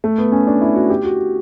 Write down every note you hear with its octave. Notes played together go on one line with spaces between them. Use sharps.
A3
B3
C#4
D4
E4
F#4
G4
F#4